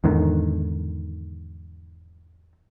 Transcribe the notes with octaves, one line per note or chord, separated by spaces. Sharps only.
E2 G#2 D3 D#3